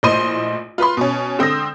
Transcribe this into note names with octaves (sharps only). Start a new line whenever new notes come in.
A#1 A2 C5 D#5 C6 D#7
F4 B4 B5 C6
B2 C#4
D3 C4 D#6 E6 A#6